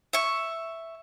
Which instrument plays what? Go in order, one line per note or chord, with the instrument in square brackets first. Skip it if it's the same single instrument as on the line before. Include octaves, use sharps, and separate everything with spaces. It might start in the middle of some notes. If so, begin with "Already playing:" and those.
[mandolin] E5 C#6